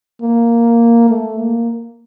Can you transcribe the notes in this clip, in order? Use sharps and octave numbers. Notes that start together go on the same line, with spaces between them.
A#3
A3
A#3